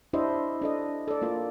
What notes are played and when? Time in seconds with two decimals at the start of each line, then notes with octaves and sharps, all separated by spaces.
0.13 D4 E4 G4 C5 D#5 E5
0.62 D4 A4 D#5
1.08 A4 D5
1.22 A#3 F4 D5